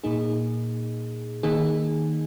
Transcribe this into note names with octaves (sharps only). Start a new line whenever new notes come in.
A#2 A#3 D#4 G#4
D#3 A#3 D#4 G#4